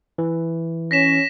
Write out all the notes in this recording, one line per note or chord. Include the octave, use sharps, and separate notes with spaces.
E3
C#4 A#6 B6 E7